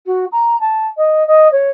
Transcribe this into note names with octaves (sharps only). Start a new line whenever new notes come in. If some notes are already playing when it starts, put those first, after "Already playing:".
F#4
A#5
A5
D#5
D#5
C#5